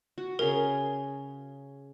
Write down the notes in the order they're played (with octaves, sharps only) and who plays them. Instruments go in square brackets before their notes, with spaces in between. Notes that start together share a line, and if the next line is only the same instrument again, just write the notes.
[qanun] F#4
[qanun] C#3 G#4 A#5 [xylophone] A#4